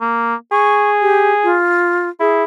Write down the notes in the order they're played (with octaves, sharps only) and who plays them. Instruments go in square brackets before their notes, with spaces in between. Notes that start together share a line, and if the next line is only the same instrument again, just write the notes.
[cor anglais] A#3
[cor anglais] G#4 [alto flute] C#6
[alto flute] G4
F4
[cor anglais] E4 [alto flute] G#4